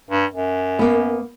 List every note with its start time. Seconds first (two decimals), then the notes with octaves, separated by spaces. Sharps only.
0.11 G2
0.34 F#2
0.79 A#3 B3